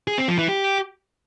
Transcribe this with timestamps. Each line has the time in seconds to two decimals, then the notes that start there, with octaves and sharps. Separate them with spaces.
0.07 G#4
0.18 C4
0.28 F3
0.38 E3
0.49 G4